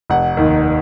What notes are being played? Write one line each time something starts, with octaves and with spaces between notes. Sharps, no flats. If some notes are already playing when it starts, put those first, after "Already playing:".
F1 F#5
D#2 D#3